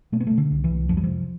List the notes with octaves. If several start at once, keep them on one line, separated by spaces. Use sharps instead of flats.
B2 A3
B3
B2 A3
D3
C2
E3
C2
F2 F3
G3
C3 F3